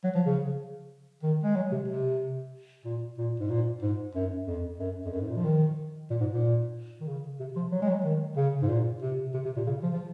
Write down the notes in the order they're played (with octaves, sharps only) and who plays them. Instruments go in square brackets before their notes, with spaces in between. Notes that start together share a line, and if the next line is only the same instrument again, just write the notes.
[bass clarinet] F#3
F3
C#3
D#3
G#3
F#3
C3
C3
A#2
A#2
G#2
A#2
G#2
F#2
F2
F#2
F2
F#2
G#2
A#2
F3
D#3
A#2
G#2
A#2
D#3
C#3
C3
F3
F#3
G#3
F#3
D#3
C#3
G#2
A#2
C3
C3
C3
A#2
C#3
F3
F3